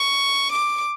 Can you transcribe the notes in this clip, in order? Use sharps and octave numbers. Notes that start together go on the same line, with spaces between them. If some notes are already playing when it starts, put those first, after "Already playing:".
Already playing: C#6
D6